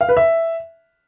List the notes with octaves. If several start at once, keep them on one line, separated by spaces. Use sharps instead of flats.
F5
B4
E5